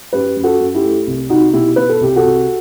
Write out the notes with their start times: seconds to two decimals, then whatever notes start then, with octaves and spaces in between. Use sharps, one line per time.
0.13 F#2 G4 B4
0.36 F#2
0.44 F#4 A4
0.60 F#2
0.75 E4 G4
0.84 A3
1.07 C2
1.29 C2 D#4 F#4
1.53 B2 E4 G4
1.76 B2 B4
1.89 A4
2.01 C2 G4
2.16 F#4 A4
2.24 C2